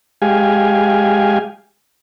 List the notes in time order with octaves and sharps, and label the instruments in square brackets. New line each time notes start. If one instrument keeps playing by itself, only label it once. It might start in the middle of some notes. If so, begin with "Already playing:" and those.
[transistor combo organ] G#3 G4 F5 G#5